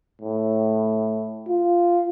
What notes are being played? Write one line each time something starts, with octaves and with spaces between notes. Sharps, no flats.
A2
F4